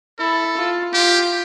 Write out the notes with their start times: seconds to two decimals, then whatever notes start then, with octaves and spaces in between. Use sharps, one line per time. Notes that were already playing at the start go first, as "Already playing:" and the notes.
0.19 E4 A4
0.57 F4
0.93 F4 G4